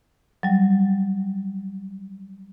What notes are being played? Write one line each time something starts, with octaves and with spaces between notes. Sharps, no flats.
F#3 G3